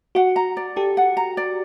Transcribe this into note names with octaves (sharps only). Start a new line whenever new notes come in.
F#4 F#5
A#5
D5
G4 A4
F#5
A#5
D5